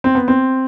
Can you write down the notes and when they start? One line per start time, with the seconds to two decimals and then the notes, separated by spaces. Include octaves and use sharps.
0.04 C4
0.15 B3
0.28 C4